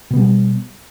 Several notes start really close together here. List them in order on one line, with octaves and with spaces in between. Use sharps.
B2 B3 G3